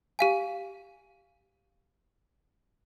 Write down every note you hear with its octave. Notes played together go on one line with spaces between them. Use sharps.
G4 F5 G#5